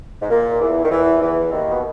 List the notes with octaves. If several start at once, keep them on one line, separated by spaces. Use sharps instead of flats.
G#2
A#2
E2 E3
D#3
E2 E3
E2 E3
D#2 D#3
B2